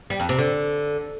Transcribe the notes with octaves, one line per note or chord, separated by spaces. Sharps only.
G3
F2
C3
D3